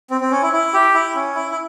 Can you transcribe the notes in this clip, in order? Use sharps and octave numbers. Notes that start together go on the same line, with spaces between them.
C4
C4
C#4
E4
E4
G4
E4
C#4
E4
E4